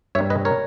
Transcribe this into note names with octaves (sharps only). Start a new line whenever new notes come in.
G2 G3 C#5 E5
B4 D#5
A#4 C#5